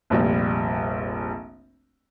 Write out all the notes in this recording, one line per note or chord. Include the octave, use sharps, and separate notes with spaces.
F1 A#1 G3